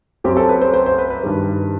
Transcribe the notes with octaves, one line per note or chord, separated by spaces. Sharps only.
F#2 F#3 C4 G4
A4
B4
C5
C5
C5
B4
B4
G2 D#3 G3